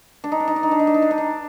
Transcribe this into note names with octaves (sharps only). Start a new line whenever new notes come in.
D4
D#4
D4
D#4
D4
D#4
D4
D#4
D4
D#4
D4
D#4
D4